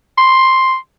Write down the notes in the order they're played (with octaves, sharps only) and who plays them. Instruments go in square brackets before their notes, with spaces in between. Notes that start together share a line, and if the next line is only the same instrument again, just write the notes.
[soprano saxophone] C6